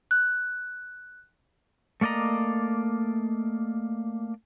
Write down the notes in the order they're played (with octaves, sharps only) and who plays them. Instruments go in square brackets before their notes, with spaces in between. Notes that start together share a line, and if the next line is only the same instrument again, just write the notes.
[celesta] F#6
[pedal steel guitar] A3 A#3 D5 D#5 A#5